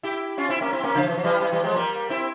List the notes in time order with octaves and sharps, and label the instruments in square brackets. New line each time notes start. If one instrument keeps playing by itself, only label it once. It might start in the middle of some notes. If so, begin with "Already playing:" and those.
[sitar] E4 G4
C#4 F4
C4 E4
A#3 C#4
C4 E4
A#3 C#4
C#3 F3
E3
F3
E3 G3
E3 G3
E3 G3
F3 G#3
G3 A#3
C4 E4